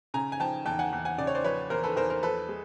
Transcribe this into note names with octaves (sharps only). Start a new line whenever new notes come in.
C#3 G#5 A#5
G#5
F3 G5 A5
E2 G5 A5
F#5 G#5
E2
F#5 G#5
C#3 D5
C#5
C5 D5
F3 B4 C#5
E2 A#4 C5
A4 B4
E2 A#4 C5
A#4 C5
F3 A4 B4
G#3